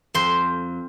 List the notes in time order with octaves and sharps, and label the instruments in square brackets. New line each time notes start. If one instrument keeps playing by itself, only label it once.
[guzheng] F2 C5 C6